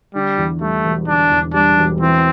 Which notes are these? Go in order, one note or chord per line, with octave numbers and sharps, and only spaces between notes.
D3 G3
E2
G3 A3
E1
D3 D4
E2
G3 D4
E1
E3 C4